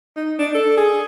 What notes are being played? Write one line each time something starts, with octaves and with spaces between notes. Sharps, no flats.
D#4
D4
A4
G#4